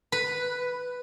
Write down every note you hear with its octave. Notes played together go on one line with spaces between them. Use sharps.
B4